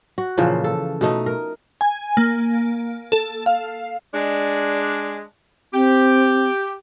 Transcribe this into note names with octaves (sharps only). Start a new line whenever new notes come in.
F#4
A#2 C#3 E3 F3
A4
B2 A3 D#4
A#4
G#5
A#3
A4
F5
G#3 D4
C4 G4